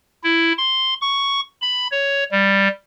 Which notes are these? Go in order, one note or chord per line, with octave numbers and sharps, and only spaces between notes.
E4
C6
C#6
B5
C#5
G3